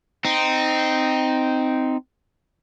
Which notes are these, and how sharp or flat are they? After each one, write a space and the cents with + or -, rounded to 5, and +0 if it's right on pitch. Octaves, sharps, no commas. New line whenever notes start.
C4 -10 D#4 +0